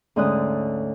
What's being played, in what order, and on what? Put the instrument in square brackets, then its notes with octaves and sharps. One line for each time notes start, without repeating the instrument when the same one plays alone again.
[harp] D2 G#2 D3 C#4 D#6 F#6